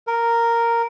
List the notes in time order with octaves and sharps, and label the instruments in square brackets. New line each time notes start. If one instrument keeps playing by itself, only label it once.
[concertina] A#4